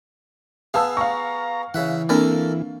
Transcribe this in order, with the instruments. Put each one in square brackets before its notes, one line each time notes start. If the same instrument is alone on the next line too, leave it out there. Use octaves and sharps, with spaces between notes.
[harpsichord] B3 G#4 [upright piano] F5 A5 E6
[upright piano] F5 C#6 [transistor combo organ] A#5
[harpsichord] C#3 E5 F#5 [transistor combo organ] E3
[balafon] A#3 C4 D4 [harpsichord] A4 A#4 D5